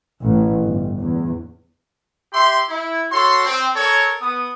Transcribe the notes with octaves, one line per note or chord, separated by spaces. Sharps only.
A1
G1
E2
G4 E5 C6
E4
F#4 A4 C#5 C6
C4
A4 A#4 C#5
B3 D#6